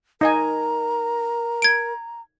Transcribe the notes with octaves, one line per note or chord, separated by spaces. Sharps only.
D#4 A#4 D#5 G#5 A#5
G#6 D7